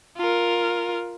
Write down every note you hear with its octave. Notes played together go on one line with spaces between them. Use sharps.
F4 A#4